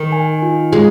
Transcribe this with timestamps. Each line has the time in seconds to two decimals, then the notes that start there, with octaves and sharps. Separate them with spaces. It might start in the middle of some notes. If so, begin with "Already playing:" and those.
Already playing: D#3
0.12 G#5
0.42 F4
0.72 G#3 F4